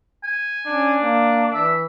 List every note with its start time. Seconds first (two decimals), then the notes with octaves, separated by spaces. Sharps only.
0.24 G#5
0.67 C#4 D4
1.01 A#3
1.54 E3 E5